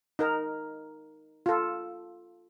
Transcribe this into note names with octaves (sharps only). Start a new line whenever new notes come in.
D#4 A#4
F4 A4